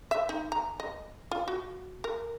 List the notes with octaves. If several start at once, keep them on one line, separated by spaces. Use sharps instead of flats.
E5
D#4
A#5
D#5
F4
F#4
A#4